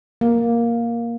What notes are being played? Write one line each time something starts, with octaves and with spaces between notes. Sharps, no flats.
A#3